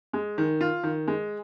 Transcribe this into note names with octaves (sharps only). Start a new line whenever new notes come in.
G#3
D#3
F4
D#3
G#3